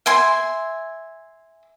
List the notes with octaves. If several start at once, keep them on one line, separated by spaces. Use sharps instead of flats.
E5 G#5 C6